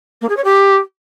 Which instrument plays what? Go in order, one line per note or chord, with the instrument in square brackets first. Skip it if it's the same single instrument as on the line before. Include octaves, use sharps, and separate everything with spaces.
[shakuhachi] A#3
G#4
C#5
G4